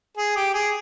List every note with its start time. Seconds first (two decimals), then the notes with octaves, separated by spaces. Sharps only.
0.17 G#4
0.36 G4
0.54 G#4